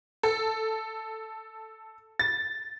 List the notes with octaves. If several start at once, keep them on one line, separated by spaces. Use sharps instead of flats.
A4
A6